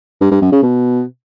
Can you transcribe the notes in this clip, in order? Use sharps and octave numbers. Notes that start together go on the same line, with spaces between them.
G2
G2
F#2
C#3
B2